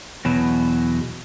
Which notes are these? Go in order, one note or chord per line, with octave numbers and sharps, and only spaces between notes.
E2 B2 F#3